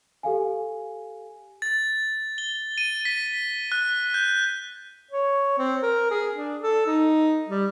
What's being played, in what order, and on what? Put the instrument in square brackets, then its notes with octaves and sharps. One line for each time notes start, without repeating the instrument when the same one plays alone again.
[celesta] G4 A4 F5 G#5
[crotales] A6
G7
D#7
B6
F#6
G6
[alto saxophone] C#5
C4
A#4
G#4
D4
A4
D#4
G3